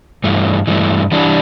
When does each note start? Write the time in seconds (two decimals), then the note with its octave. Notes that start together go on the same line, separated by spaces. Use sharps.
0.24 G2 E3 A3
0.67 G2 E3 A3
1.12 E3 G3 D4